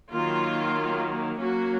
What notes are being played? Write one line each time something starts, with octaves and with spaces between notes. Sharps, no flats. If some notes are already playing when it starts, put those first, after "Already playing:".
D#3 F#3 A#3 F4
F#3 A#3 C#4 F#4